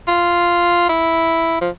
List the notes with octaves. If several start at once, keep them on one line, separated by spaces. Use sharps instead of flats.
F4
E4
F3